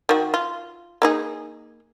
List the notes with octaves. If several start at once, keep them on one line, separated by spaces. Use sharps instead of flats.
D#3 F#4
F4
A#3 D#4 G#4